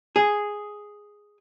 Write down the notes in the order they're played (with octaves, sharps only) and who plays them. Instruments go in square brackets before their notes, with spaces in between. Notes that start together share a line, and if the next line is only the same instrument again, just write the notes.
[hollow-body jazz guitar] G#4